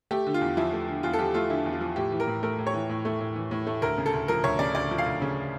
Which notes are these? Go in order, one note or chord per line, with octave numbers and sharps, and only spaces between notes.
A3 G4
D3
F4
E2
F3 E4
A3
D3
E2 F4
A4
F3 G4
A3 F4
D3 E4
E2
F4
F3
A2 G4
E3
A#4
A2
A3 A#4
A2
C#5
E3
A2
A3
A2
E3
A2
A3
D2 A#4
C#3
A4
D2
F3 A#4
D2 C#5
C#3 D5
D2 D5
F3
F5
D2
C#3